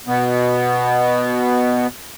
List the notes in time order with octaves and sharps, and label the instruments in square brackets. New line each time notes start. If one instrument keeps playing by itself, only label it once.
[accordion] B2 B3